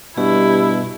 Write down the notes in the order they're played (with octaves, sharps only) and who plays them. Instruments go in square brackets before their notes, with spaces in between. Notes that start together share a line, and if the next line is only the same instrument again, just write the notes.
[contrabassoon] G2 [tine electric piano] B2 [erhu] E4 [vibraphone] G4